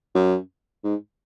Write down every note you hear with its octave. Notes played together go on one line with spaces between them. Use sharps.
F#2
G#2